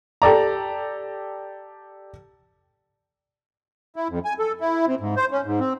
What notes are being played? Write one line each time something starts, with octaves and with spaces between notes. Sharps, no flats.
G4 A4 D5 A#5
E4
F2
G#5
A4
E4
C3
G#2
C5
C#4
G#2
C4